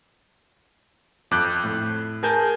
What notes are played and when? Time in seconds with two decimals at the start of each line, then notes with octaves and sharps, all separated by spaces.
1.31 F2 D6 F#6 G6
1.64 A2
2.23 G#4 A#4 G#5 A5 G6